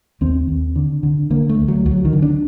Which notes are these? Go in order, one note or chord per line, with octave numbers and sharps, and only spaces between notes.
D#2 C4
D#2
D3
D3
D3 A#3
A3
D2
F#3
D2 F#3
D#3
D3
D4